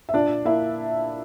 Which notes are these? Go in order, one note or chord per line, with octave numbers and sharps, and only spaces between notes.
E5
A#2 D4 D5
A#3 E4 E5